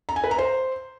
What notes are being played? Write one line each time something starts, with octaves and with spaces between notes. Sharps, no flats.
A#5
G#5
B4
A#5
C5